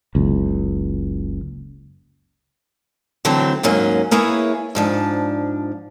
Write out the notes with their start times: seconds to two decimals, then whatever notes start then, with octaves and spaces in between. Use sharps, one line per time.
0.15 F#1 C#2
3.25 D3 E3 F#3 A3 C4
3.63 D#2 G#2 F#3 A#3 C#4
4.11 A#3 B3 E4 G#4 C#5
4.75 G#2 F3 D4